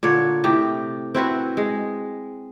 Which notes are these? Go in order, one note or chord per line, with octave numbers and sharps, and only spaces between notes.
A#2 D3 C#5
A2 C3 G4
C4 E4 F#4 B4
G#3